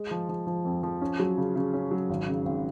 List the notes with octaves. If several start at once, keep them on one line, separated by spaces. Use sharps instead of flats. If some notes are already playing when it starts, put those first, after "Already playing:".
Already playing: G#3
F3
F3
F3
F2
F3
C#4
F#3
C#3
C#3
C#4
F#3
G#1
C#3
G#1